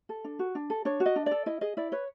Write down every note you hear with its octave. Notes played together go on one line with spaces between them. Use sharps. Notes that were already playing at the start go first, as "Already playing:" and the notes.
A4
D4
F#4
D4
A4
D4 C#5
F#4
D#5
D4
A4 D5
E4 D#5
G#4 D#5
E4 D5
B4 C#5